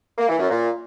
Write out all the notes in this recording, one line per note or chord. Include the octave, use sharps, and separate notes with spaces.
A#3
E3
F#2
A#2